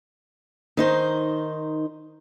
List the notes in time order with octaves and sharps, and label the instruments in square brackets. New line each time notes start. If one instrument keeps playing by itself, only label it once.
[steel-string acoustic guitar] D#3 D#4 C5